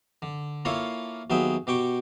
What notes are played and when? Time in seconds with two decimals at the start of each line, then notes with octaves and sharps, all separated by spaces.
0.22 D3
0.65 A#3 E4 F4 A4 C#5 F5
1.30 D#2 F#3 B3 G#4 E5 G5
1.67 B2 G4 G5 C#6 D6